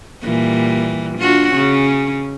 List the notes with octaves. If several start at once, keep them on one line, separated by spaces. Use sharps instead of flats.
A#2 E3 G3
D4 F4 F#4
C#3 C#4